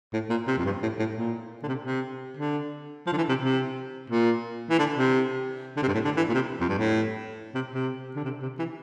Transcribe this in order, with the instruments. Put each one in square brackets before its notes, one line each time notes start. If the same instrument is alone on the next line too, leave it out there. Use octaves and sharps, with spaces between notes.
[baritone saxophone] A2
A#2
C3
F2
G2
A2
A2
A#2
D3
C3
C3
D3
F3
D3
E3
C3
C3
A#2
E3
D3
C3
D3
C3
G2
A2
D3
E3
A#2
C3
F2
G2
A2
C3
C3
D3
C3
C3
E3